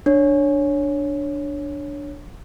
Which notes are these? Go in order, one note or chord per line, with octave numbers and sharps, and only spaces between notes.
D4 C#5